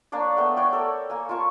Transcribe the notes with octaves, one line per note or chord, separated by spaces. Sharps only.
A#3 D4 C#5 D5
A3 B3 G5
C#5 D5 G5
A4 A#4 C#5
A#3 G#5
F4 A#4 A5 C#6